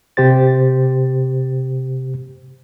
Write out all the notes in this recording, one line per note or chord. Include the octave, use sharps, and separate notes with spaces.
C3 G4 C5 A6